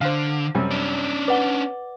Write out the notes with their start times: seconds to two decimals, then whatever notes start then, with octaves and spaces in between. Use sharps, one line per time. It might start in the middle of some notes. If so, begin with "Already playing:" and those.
0.01 D3 C5 F5
0.55 F#2 C3 G3
0.71 C#4 D4
1.28 B4 D5 F#5 G7